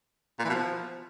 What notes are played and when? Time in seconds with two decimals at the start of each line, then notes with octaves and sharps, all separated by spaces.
0.39 A#2
0.44 E3
0.49 B2
0.55 F3